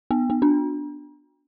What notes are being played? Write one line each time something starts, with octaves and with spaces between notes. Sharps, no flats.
B3
B3
D4